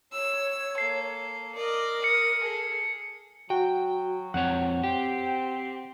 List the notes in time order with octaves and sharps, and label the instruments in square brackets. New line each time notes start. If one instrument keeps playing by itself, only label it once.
[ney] C#5 [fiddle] E6
[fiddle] A#3 A4 [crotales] C7
[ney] A#4 [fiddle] D5 D#5
[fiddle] D#6 [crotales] C#7
[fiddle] G#4 A4
[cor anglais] F#3 [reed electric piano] F#4 [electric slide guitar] G5
[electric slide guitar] F2 C4 C#5 [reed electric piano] F#5
[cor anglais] C4 [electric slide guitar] G4